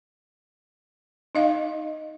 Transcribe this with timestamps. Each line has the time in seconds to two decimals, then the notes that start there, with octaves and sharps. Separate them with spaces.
1.35 D#4 D#5 F5